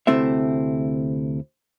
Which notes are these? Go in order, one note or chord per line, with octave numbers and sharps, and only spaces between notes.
D2 C3 A3 C4 E4 E5